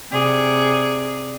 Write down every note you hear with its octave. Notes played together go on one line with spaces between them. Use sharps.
C3 G#4 D5